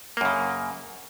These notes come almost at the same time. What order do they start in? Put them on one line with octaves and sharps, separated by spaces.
A#3 F#2 C#3